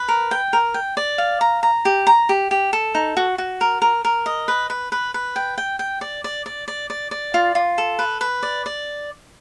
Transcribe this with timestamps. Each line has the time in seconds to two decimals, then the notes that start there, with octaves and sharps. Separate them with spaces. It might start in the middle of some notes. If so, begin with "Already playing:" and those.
Already playing: B4
0.08 A#4
0.31 G5
0.53 A#4
0.74 G5
0.97 D5
1.18 F5
1.41 A#5
1.63 A#5
1.85 G4
2.07 A#5
2.29 G4
2.51 G4
2.73 A4
2.95 D#4
3.17 F#4
3.38 F#4
3.61 A#4
3.82 A#4
4.05 A#4
4.26 D#5
4.48 B4
4.70 B4
4.92 B4
5.14 B4
5.36 G5
5.58 G5
5.79 G5
6.01 D5
6.24 D5
6.46 D5
6.68 D5
6.90 D5
7.11 D5
7.34 F4
7.55 F4
7.78 A4
7.99 B4
8.21 B4
8.43 D5
8.66 D5